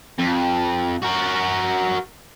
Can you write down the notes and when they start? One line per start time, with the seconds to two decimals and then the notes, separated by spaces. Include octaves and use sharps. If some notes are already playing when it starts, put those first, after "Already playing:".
0.19 F2
1.02 F#4 A#4